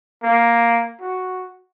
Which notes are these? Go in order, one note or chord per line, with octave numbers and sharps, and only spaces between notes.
A#3
F#4